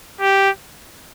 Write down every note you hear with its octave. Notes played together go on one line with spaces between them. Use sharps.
G4